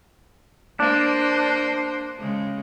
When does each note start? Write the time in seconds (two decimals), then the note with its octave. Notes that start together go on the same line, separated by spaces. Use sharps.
0.80 A#3 D4 C5
2.19 C#3 G#3